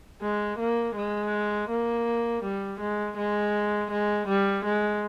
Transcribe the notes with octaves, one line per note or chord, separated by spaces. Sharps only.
G#3
A#3
G#3
A#3
G3
G#3
G#3
G#3
G3
G#3